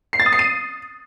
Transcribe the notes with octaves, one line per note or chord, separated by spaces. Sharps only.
C7
A6
D#6
C7
D#7